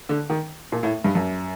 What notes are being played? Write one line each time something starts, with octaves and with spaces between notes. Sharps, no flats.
D3
D#3
A#2
A2
G2
F#2